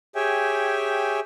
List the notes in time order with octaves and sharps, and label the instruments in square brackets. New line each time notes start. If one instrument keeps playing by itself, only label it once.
[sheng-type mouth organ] G4 G#4 C#5 E5 G5 G#5